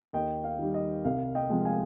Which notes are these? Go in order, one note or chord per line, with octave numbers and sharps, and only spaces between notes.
D#2 D#5 G5
F5
D#3 G3
D#5
C2 F5
D#5 G5
C3 F3 G#3
F5 G#5